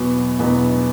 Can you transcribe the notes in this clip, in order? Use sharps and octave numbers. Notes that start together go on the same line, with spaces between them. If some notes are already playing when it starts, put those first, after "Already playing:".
Already playing: E2 B2 F#3 B3
E2 B2 F#3 B3